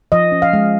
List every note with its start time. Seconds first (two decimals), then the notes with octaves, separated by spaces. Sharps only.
0.12 F3 D#5
0.32 C#4
0.42 F5
0.53 G#3